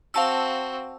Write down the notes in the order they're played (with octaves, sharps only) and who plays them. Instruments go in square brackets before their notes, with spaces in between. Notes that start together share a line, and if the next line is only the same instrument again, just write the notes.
[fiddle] C4 F#4 [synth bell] F5 A5 E6